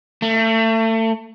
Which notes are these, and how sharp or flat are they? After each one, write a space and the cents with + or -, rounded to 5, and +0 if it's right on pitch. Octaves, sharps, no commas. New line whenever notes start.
A3 +30